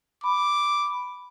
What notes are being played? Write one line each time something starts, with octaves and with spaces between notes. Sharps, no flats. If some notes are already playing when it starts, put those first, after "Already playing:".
B5 D6